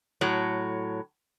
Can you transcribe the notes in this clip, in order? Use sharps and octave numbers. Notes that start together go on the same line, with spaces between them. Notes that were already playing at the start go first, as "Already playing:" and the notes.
A2 F#3